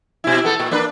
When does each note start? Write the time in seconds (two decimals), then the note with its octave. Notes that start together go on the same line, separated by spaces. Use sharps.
0.24 B2 E4
0.45 B3 A4
0.60 A#2
0.71 A#3 D4 B4